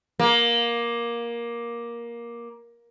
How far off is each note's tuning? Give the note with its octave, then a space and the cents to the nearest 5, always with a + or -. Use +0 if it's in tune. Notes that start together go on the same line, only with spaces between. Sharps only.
A#3 +15